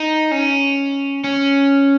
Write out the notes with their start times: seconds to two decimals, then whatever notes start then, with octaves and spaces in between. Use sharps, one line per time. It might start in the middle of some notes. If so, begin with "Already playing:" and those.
Already playing: D#4
0.31 C#4
1.24 C#4